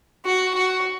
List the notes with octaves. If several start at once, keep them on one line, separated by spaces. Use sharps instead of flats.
F#4
F#4